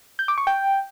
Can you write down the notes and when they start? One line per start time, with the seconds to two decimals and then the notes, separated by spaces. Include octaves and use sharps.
0.19 G6
0.28 D6
0.38 C#6
0.47 G5